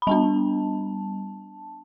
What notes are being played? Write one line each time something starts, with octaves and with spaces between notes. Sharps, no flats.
B5
G3 B3 D4 A5